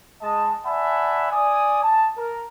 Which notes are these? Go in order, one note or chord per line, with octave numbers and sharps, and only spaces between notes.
G#3 D#5 A5
D5 E5 F#5 G#5 A5 B5
D5 G#5 D#6
A5
A#4